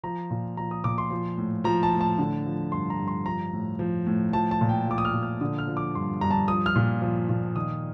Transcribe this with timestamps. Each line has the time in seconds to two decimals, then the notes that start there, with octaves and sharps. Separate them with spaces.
0.03 F3 A#5
0.30 A#2
0.57 F3 A#5
0.71 D#6
0.84 A#2 D6
0.98 C6
1.11 F3
1.38 A2
1.64 F3 A#5
1.83 A5
1.92 A2
2.01 A5
2.19 D3
2.46 F3
2.72 G2 C6
2.90 A#5
2.99 G2
3.08 C6
3.26 F3 A#5
3.53 A2
3.79 F3
4.07 A2
4.33 F3 A5
4.51 A5
4.61 A#2
4.69 G5
4.87 F3 D6
4.98 D#6
5.05 F6
5.13 A#2
5.23 F6
5.41 D3 D#6
5.58 F6
5.67 F3
5.77 D6
5.95 G2 C6
6.21 G2 A#5
6.31 A5
6.48 F3 D#6
6.66 F6
6.76 A#2
7.02 F3
7.29 A#2
7.55 D#3 D#6